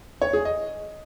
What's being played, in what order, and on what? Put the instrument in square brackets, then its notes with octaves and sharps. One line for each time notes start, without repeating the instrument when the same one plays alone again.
[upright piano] C#5
G#4
D#5